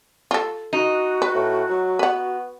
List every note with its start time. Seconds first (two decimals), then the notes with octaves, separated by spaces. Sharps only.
0.31 F4 A4
0.73 D#4 F#4
1.22 B4
1.35 A2
1.69 F#3
1.99 B3 B4 F#5